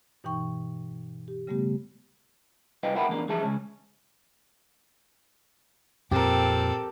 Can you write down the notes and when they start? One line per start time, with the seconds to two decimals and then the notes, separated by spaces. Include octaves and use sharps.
0.24 G2 B2 E3 D#4 G5 C#6
1.28 G4
1.47 C#3 G3 A3 B3 G4
2.83 C2 B4 D#5 F5 G5
2.96 A#4 E5 F#5 G5 A5 B5
3.09 E2 A#3 D4
3.29 E3 F3 G#4 E5 A5
3.43 C#2 C#4
6.11 F2 A#2 C4 G4 A4 A#4